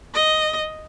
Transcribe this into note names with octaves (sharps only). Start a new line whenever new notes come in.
D#5